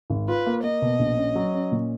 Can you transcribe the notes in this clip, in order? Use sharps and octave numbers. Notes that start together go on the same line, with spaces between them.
G#1
F4 B4
A#3
A#3 D#5
B2
A#1
C#4
F#3
C#4
A#2